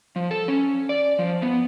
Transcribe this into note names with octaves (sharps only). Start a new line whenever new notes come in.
F3
A4
C#4
D5
F3
B3